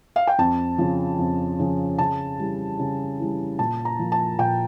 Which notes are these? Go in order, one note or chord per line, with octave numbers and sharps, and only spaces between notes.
F5
G5
F2 A5
C#3 F3
F2
C#3 F3
C#3 A5
E3 G3
C#3
E3 G3
A#2 A5
A#5
F3 A#3
A5
A#2 G5